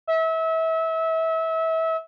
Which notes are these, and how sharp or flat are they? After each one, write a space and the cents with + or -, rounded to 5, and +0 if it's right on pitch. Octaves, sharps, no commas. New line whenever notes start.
E5 -30